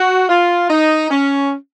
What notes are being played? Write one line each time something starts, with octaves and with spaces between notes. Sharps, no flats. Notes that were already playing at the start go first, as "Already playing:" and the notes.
Already playing: F#4
F4
D#4
C#4